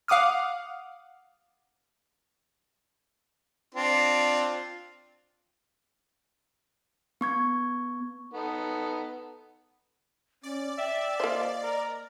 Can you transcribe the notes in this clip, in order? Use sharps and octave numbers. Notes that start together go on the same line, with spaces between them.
F5 F#5 D6 D#6 F6
C4 D4 F4
B3 C#6 G#6
B3 D#4 A4
C#4 D5
E5 G5
A#3 F4 C5 D#5
A#4